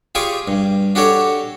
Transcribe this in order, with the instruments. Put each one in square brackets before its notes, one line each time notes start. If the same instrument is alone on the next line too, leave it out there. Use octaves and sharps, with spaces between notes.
[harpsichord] F4 G4 G#4 D5 C#6 D6
G2
D4 F#4 G4 A4 C#5 D5